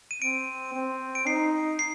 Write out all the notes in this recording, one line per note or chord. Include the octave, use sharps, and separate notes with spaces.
D#7
C4 D7
C4
D7
D#4 C7
C7